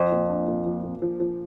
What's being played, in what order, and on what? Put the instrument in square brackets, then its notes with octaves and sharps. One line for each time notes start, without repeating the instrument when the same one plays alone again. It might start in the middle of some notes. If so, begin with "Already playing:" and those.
Already playing: [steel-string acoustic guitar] F2 [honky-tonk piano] F3
[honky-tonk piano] A#2
D4
A#2
F3
A#2
F3
F3